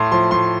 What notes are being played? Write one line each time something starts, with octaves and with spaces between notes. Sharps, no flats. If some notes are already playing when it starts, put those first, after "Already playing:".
Already playing: A2 C6
F3 C6
A2 C6